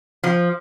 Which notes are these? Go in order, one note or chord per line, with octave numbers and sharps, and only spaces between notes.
F3